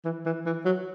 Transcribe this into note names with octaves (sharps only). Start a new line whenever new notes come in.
E3
E3
E3
F#3